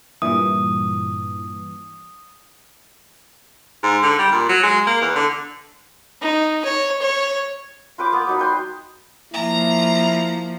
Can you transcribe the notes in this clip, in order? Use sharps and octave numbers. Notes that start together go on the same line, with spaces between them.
G2 A#2 E3 D#6
G#2
D3
G3
A#2
F#3
G#3
A#3
E2
D3
D#4
C#5
C#5
F4 B4 G5 D6
A#3 B3
F#3 D#4 B5
B4 G5 C6
F3 A#3 E4 A#5